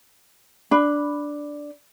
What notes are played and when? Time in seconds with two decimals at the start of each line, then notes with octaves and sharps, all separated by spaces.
0.71 D4 B5